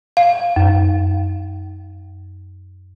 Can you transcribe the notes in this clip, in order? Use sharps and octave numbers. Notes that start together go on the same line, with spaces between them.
F5
F#2